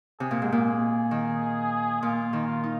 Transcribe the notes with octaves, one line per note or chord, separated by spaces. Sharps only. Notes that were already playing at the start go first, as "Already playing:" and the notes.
C3 G#4
A#2
G#2
A#2
G#4
D#3
A#2 F4
D#3
F4
D#4